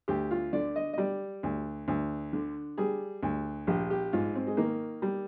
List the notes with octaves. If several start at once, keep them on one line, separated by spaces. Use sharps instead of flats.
D2 G4
F4
D3 D5
D#5
D#5
G3 D5
D2
D2
D3
G3 G#4
D2
A#1 G4
G4
G#2 F4
C4
G#3
D#3 A#3
G3